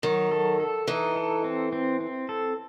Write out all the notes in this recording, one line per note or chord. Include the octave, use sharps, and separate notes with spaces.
D#3 F#3
A4
A4
E3 D#4
A4
C4
C4
C4
A4